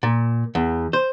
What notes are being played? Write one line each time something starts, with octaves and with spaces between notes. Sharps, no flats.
A#2
E2
C5